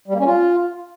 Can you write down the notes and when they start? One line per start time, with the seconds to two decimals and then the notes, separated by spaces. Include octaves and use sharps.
0.08 G3
0.14 A#3
0.20 C#4
0.25 F4